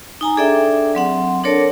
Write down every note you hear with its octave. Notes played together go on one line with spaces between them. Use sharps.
D#4 G#5 A#5
D4 G#4 A4 D5 E5 G5
F#3 C4 F#5
D4 A4 A#4 C#5 D5 A5